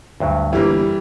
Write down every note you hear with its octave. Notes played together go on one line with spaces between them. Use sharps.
D2 G2 F#3
G1 E3 G3 A#3